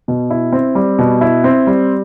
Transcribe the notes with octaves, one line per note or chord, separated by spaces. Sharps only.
B2
E4
C4
G3
B2
E4
C4
G3